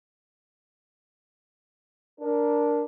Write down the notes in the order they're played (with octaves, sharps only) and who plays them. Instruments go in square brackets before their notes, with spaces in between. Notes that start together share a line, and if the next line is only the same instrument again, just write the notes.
[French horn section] D4 A#4